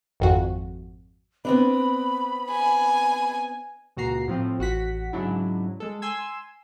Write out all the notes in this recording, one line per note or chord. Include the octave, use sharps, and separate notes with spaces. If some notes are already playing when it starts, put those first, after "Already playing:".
G#1 F2 F#4
B3 C4 D4 B5
G#5
C#2 A#2 F#4 A#5 C7
A2 F3 C4 F4
A1 F#4 F#5 B6
G#2 C#3 F#3 D4 E4
G#3 A4
G#5 C6 E6 G#6